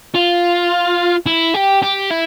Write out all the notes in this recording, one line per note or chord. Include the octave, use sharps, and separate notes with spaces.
F4
E4
G4
G4
E4